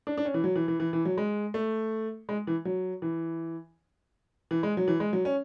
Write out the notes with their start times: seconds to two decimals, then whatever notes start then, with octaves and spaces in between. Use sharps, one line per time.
0.07 D4
0.18 D4
0.25 C#4
0.34 E3
0.44 F#3
0.56 E3
0.68 E3
0.80 E3
0.93 E3
1.05 F#3
1.17 G#3
1.54 A3
2.29 G#3
2.47 E3
2.65 F#3
3.02 E3
4.51 E3
4.63 G#3
4.77 F#3
4.88 E3
5.00 G#3
5.13 F#3
5.25 C#4